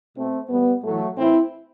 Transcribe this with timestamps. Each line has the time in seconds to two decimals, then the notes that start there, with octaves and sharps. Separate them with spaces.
0.16 B2 A3 C4
0.49 A2 E3 G3 B3
0.83 A2 E3 F#3 A3
1.17 A2 E3 C4 E4